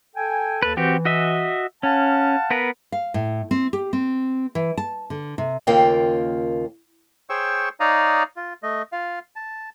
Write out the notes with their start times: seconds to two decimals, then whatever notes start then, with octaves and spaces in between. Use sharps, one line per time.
0.16 A4 G5 G#5
0.62 D#2 A4 B4 A5
0.77 E3 C4 F#4 G4
1.05 F#4 D#5 E5
1.83 C#4 F5 F#5 A5
2.51 B3 A#4 B4
2.92 F5
3.14 A2
3.51 C4
3.73 G4
3.93 C4
4.55 E3
4.77 A5
5.10 D3
5.38 C3
5.67 D#2 C#3 A#3 F4 G5
7.30 G#4 C5 C#5 G5 C#6 E6
7.80 D#4 C#5 D5 F5 A#5 D#6
8.36 F4
8.63 A3 D#5
8.92 F4 F5
9.36 A5